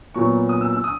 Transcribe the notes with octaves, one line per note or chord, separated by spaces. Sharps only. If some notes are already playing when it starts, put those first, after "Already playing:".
A#2 F#3 B3 C#6
D#6
E6
E6
D#6